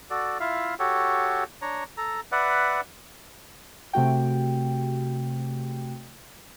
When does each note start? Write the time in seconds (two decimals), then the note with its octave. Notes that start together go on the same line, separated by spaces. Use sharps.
0.10 F#4 A4 D5
0.40 E4 F4 E5 F5
0.79 F#4 G4 A4 C#5
1.62 D4 C#5 A#5
1.97 A4 A#5
2.32 B4 D5 E5 F#5
3.93 C3 A3 F#4 G5